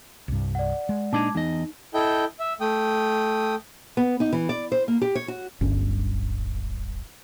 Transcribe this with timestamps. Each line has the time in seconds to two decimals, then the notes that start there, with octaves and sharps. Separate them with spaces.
0.28 C2 G2
0.55 D5 F#5
0.89 G#3
1.13 A#2 D4 D#4 A5 D6 G#6
1.35 E2 D#4 D#5
1.94 E4 A4 D#5 G5 G6
2.40 E5
2.61 A3 G5 D#6
3.97 B3
4.20 D#4
4.33 E3
4.49 D5
4.72 C5
4.88 A#3
5.02 G4
5.15 C#5
5.28 F#4
5.61 D1 G1 G2 C#4